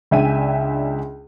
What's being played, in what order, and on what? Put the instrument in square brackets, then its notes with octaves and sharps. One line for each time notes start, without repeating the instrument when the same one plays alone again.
[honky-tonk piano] C#2 D4 E5 G5 G#5 D#7